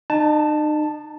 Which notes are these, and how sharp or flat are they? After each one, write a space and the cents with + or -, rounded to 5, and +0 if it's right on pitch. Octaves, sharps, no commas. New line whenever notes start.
D#4 -40 A5 +0